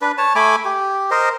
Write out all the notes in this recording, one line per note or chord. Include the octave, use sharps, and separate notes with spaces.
D4 B4
C#5 A5
A3 G#5 B5 D6
G4
A#4 C5 D#5